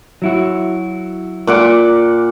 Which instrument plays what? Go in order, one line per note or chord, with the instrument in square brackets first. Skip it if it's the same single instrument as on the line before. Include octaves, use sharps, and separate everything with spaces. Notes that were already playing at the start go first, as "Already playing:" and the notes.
[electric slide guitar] F#3 E4 F#4
[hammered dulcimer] A#2 F#5 D6